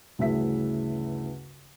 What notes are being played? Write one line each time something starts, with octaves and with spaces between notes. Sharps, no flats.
D2 G2 C#3 E3 E5 B6